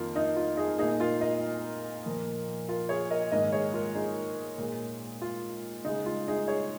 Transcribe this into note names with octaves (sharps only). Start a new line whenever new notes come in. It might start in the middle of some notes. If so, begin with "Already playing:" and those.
Already playing: F2 D#3 A#3 F4 A#4
D#4
F4
D#4 G#4
A#2 A#3 D#4 G#4
F4 A#4
A#4 D#5
A#2 F3 A#3
F4 A#4
G#4 C#5
A#4 D#5
G#2 D#3 A#3 A#4 D#5
G#4 C#5
F4 A#4
D#4 G#4
A#2 G#3
F4
C#3 G#3 D#4
F4
D#4 G#4
G#4 C#5